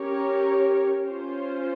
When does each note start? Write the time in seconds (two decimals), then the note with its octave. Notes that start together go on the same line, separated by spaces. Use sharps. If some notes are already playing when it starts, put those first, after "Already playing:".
Already playing: C#4 G4 A#4 C#5
1.08 C#4 F4 C5